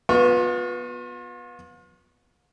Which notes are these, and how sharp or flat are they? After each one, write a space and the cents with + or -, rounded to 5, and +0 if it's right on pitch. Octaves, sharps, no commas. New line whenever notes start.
B3 -10 F4 +40 C#6 +0